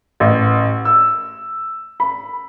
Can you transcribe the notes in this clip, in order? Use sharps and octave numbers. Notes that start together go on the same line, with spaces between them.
A1
E6
B5